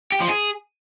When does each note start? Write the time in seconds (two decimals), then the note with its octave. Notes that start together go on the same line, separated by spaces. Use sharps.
0.12 G4
0.21 F3
0.29 G#4